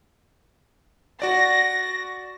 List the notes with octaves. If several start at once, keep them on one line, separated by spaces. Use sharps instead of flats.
F#4 D5 A#6